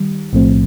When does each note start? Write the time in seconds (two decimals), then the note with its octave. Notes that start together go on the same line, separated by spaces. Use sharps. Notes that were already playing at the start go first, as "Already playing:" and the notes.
Already playing: D#3 G3
0.33 B1 A2 F3 A3 C4